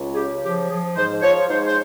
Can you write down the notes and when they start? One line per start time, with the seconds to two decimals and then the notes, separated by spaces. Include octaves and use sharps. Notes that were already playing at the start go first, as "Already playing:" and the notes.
Already playing: C#2
0.13 G#4
0.16 C#3 G4
0.43 F3 G4
0.69 F3 G#4
0.96 G#2 C5
1.22 F3 C#5
1.49 G#2 C5
1.66 C5